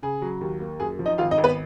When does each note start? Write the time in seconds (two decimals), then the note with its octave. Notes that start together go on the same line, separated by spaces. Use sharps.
0.03 C#3 G#4
0.22 F#3
0.41 D#2
0.60 A#3
0.80 F#2 G#4
0.99 F3
1.06 D#4 D#5
1.18 G#1 F4 F5
1.31 D#4 D#5
1.38 G#1
1.44 B3 B4